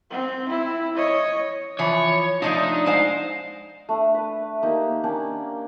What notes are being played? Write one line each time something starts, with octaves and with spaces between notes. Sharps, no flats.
C4
E4
C#5 D#5
E3 F3 C#5
F3 A3 D4 D#4
G#3 C5 F5
A3 D4 E5 D#6
B4
A#3 D#4 G4
A#3 C#4 D4 G5